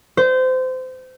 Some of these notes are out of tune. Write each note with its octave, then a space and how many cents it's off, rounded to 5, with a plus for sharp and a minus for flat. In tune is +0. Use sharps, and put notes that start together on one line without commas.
C5 -25